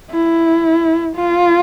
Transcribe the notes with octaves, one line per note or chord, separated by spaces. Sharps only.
E4
F4